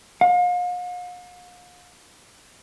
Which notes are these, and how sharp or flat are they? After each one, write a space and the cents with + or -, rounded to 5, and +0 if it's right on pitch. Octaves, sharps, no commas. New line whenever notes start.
F5 +40